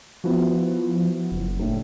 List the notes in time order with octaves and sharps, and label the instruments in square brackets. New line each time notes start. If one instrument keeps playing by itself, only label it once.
[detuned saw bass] F3 [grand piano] B3 E4 F#4
[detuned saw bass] F#1
[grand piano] A#1 A2